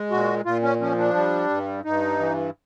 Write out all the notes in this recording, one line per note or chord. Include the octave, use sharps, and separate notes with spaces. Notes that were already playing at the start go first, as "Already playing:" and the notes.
Already playing: G#3
A#2 F#4
A#2 F4
C#4
F3 C#4
D4
G3
G2
G2 D#4
E3